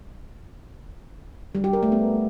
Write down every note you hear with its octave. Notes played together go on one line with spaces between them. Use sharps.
G3
G4
A#4
A3
B3